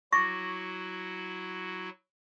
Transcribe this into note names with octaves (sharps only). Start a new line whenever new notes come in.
F#3 E4 F#4 C#6 D6 A6 A#6